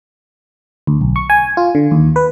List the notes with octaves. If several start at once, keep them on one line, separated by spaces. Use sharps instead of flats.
D2
B1
C#6
G#5
F4
D3
D#2
B4